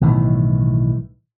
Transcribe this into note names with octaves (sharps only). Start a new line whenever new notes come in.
B1 A2 D#3 E3